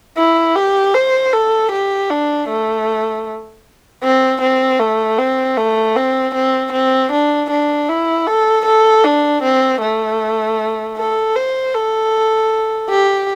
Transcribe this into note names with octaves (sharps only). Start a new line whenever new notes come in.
E4
G4
C5
A4
G4
D4
A3
C4
C4
A3
C4
A3
C4
C4
C4
D4
D4
E4
A4
A4
D4
C4
A3
A4
C5
A4
G4